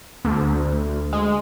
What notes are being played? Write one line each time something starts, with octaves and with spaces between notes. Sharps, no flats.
D2
G#3